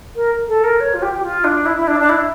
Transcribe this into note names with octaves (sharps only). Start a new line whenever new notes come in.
A#4
A4
A#4
C#5
F4
G4
G4
F4
D4
E4
E4
D4
D4
E4